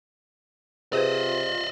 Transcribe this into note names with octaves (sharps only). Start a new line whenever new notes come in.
C3 F4 G#4 B4 C5 D5 D#5